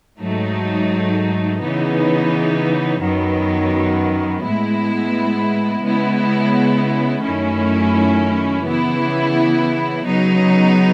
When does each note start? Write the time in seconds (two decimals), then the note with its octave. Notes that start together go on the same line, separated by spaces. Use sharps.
0.19 G#2 F#3 A3 D#4
1.60 C#3 E3 B3 D#4
3.01 F#2 D#3 F#3 B3
4.42 A2 G#3 B3 E4
5.83 C#3 G#3 B3 E4
7.23 F#2 D#3 A3 C#4 E4
8.64 C#3 E3 B3 E4
10.05 C#3 F#3 B3 D#4